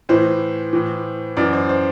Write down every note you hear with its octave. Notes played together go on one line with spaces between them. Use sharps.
A2 E3 C5
A2 E3
F#2 E3 D5
C5
C5